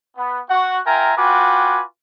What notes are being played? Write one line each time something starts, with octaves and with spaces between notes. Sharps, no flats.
B3
F#4 F#5
F4 A#4 E5 G5 G#5 A#5
F4 F#4 B4 G5 G#5 D6